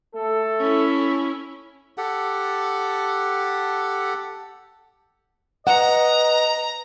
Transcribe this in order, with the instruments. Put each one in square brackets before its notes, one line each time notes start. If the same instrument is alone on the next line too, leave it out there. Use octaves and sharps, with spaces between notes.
[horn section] A3 A4
[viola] C#4 E4
[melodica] G4 A4 F#5
[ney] B4 [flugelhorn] D#5 [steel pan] F#5 [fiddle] A#5